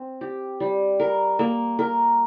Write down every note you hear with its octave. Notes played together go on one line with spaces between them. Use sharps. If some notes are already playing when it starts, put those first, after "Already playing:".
Already playing: C4
G4
G3
A#4
A#3
A#4